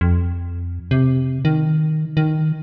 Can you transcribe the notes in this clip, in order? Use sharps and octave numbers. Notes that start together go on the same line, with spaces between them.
F2
C3
D#3
D#3